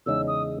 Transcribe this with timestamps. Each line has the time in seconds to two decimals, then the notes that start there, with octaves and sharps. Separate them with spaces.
0.06 E2 C#3 G#3 D#4 E6
0.28 D#6